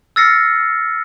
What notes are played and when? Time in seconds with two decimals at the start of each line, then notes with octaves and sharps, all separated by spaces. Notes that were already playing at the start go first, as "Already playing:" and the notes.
0.16 E6 F6 A6 A#6 C7 C#7